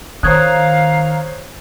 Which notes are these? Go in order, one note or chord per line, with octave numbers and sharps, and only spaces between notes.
D#3 C5 C#5 F5 A#5 D#6 F#6 G#6